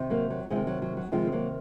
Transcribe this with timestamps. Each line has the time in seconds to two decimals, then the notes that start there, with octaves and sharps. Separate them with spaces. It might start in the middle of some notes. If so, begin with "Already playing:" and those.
Already playing: C3 D#3
0.10 F#3 A#3
0.30 F#3
0.50 C3 F3 G#3
0.56 D#3
0.67 F#3
0.82 F#3
0.97 F#3
1.12 C3 D#3 F3 G#3
1.27 C4
1.32 F#3 A#3